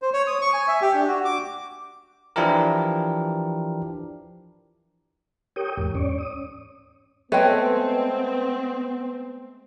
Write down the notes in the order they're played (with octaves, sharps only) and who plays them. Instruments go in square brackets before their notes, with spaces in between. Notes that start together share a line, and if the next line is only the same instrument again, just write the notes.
[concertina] C5
C#5
D#6
C#6
G#5
E5
G4
D4
F#4
D6
[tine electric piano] E3 F3 D4 E4 G4 A#4
[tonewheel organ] G4 A#4 C#5 G5 D#6
E2 G#2
C#4 C#5 D5
D#6
[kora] G#3 A3 [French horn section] B3 [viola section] C4 [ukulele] B4 C#5 G5